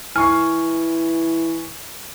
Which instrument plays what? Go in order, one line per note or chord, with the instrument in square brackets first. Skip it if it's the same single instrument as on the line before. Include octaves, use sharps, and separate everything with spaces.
[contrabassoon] E3 [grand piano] G#5 C#6 C7 [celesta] F6